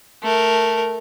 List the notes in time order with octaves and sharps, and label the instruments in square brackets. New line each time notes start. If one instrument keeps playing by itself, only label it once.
[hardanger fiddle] A3 A#4